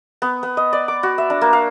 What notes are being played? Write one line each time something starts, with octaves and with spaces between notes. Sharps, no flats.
B3
B3
D#5
D5
D6
F#4
E5
D4
A#3
F5